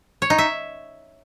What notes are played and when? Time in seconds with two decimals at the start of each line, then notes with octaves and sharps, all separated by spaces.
0.22 C#5
0.30 D#4
0.38 E5